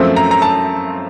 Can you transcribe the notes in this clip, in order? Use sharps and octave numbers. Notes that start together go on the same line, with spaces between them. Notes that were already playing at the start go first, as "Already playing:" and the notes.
Already playing: F#2 F3 A3 C4
A#5
A#5
A5